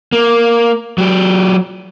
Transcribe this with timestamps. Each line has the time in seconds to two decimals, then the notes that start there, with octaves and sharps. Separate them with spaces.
0.13 A#3
0.98 F#3 G4